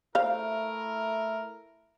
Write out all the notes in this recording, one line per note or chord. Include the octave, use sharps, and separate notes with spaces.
A3 E4 A#4 C5 F5